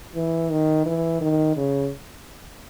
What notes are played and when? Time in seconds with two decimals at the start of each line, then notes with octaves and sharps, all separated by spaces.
0.15 E3
0.50 D#3
0.86 E3
1.21 D#3
1.56 C#3